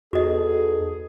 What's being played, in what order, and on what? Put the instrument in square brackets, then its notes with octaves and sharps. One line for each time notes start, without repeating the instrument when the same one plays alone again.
[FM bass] E2 [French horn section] B3 D#4 A4 [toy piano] F#4 D#5 [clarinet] G#4